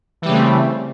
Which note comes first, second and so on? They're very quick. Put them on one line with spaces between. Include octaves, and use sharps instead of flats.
E3 G3 C#3 A3 C4